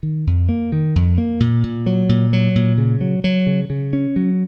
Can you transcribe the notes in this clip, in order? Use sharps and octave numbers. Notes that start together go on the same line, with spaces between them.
D#3
F2
A#3
D#3
F2
A#3
A#2
A#2
F#3
A#2
F#3
A#2
C#3
F#3
F#3
C#3
C#3
C#4
F#3